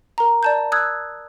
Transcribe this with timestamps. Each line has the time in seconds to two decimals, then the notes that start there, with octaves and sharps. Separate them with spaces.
0.18 A#4 A#5
0.43 D5 A5 G6
0.72 D#6 E6 F#6 G#6